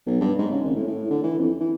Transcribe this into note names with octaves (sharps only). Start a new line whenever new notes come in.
B1
G2
G#2
C#3
G#1
A2
A2
D3
E3
F2
E3